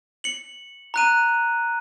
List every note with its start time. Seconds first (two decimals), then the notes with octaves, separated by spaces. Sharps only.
0.24 C#7 F#7
0.94 A#5 F#6 D#7